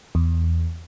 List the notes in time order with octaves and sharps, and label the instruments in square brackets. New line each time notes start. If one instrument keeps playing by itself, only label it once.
[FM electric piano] E2